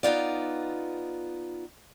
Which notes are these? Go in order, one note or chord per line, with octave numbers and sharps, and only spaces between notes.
B3 D#4 F4 D5